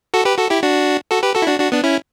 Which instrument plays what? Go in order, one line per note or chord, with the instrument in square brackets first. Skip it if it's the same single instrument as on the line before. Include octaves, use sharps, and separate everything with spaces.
[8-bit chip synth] F#4 A4
G4 B4
F#4 A4
E4 G4
D4 F#4
F#4 A4
G4 B4
F#4 A4
E4
D4 F#4
D4 F#4
B3 D4
C#4 E4